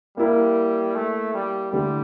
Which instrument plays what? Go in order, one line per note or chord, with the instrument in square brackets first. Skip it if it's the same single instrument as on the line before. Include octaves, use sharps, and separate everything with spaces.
[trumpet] G3 [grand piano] A#3 E4 A#4
[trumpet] A3
G3
[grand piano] D3 A3 E4 G4 [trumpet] G3